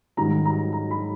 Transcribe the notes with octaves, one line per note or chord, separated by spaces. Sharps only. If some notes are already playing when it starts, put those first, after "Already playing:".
G#2 D#3 G3 A#5
A#5
A#5
B5